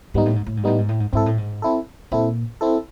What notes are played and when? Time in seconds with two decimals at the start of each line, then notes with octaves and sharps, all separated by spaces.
0.14 G#2 G3 B3 D#4
0.26 A2
0.36 G#2
0.46 A2
0.57 G#2
0.64 A2 G3 B3 D#4
0.78 G#2
0.89 A2
1.00 G#2
1.13 G#2 C4 E4 A4
1.26 A2
1.38 G#2
1.62 C4 E4 A4
2.12 A#2 C4 E4 A4
2.61 C4 E4 A4